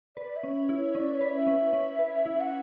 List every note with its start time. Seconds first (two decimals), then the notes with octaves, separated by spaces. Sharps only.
0.17 B4 D5
0.36 E5
0.43 C#4
0.69 E4
0.76 C#5
0.95 C#4 D5
1.15 C#5
1.21 B4 D5
1.34 E5
1.47 C#4
1.73 C#4
1.99 B4
2.26 E4
2.40 F#5